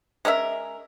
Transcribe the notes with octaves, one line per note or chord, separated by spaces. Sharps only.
G#3 C#4 A#4 E5